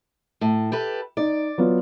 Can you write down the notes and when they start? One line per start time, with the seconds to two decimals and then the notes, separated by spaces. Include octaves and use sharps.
0.41 A2
0.72 G4 A4 B4
1.17 D#4 D5
1.58 F#3 B3 F4